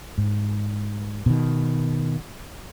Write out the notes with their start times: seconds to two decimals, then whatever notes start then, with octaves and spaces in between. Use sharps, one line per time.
0.18 G#2
1.26 B2 D#3